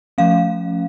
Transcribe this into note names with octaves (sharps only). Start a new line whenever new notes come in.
F3 A3 C#4 F5